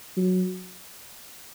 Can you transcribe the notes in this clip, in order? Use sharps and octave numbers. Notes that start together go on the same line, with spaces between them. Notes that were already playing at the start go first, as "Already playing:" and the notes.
F#3